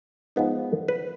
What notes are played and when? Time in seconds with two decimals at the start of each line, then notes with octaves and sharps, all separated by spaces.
0.36 G#2 F3 B3 D#4
0.88 B4